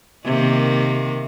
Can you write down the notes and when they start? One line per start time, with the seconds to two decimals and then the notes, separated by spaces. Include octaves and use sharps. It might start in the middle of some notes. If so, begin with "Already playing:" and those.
0.25 C3 D#3 A#3